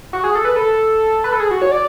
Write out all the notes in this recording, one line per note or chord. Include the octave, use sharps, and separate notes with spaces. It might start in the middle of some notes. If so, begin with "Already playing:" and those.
F#4
G#4
A4
B4
A4
B4
A4
G#4
F#4
C#5
D5